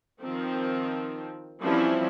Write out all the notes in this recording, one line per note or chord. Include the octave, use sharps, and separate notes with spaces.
D#3 F3 C4
E3 F3 G3 C4 C#4 E4